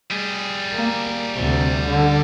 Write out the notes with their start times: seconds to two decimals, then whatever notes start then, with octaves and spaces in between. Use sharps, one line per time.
0.10 G3 G#4
0.73 A#3
1.35 D2 C3
1.88 D3